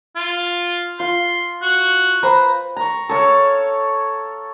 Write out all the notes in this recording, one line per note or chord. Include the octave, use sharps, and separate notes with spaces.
F4
F4 C6
F#4
B4 C5 A#5
A#5 C#6
A4 C#5 F5